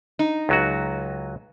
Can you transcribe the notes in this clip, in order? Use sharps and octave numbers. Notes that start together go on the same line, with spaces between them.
D#4
C#2 F#3 F#4